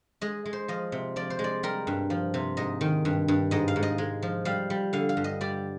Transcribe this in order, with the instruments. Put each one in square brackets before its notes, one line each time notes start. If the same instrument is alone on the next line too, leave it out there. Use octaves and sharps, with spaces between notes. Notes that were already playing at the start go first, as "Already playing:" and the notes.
[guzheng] G#3 D#5
G#3
C5
F3 D#5
C3
F3 D5
C5
G#3
D5
G3 A#4
G2
F3
C3
G#2 D#5
D#3
G2
G2
G#2 D#5
F5
G#2
D#5
G#3
F3
G3 F5
G3
D3 F5
F5
G2
D#5
G3 D5